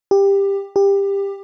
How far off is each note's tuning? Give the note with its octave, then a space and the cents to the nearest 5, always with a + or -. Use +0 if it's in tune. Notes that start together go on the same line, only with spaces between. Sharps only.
G4 +15
G4 +20